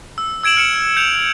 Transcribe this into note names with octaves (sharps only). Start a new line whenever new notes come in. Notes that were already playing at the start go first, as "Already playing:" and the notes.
E6
E6 G#6 D7 E7 F#7
F6 C#7 E7
G6 C#7 F7